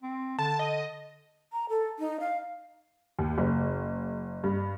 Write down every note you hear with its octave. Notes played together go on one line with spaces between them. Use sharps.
C4
D3 A5
D#5
A#5
A4
D#4
F5
D#2
F#1
G2